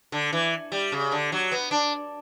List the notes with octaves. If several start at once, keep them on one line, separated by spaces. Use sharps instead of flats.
D3
E3
G3
C#3
D3
F#3
B3
D4